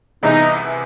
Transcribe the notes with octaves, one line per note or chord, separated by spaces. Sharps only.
C2 C3 E3 G#3 B3 D#4